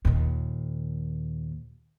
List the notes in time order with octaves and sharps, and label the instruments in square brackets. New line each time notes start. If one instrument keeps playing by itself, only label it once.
[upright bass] D#2 A#2